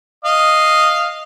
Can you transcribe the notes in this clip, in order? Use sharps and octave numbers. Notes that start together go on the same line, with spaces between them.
D#5 F5